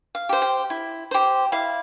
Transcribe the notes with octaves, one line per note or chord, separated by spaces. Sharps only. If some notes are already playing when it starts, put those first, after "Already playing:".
F5
G4 C5
G5
E4
G4 C5
E4 F5